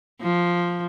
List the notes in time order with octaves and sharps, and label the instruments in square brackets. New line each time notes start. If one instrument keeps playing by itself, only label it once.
[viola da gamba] F3